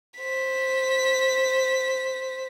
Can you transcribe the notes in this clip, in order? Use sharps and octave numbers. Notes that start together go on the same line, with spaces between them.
C5 B6